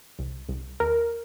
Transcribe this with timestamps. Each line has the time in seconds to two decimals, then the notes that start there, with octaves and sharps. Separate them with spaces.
0.19 C2
0.49 C2
0.80 D#2 A#4